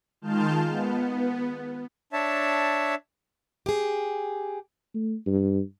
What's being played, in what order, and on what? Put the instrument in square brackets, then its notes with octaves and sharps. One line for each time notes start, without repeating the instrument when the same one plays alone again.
[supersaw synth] D#3 G#3 F4 A5 F6 G6
B3
[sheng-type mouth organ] D4 C#5 E5 A5
[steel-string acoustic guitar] G4 G#4
[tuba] A3
G2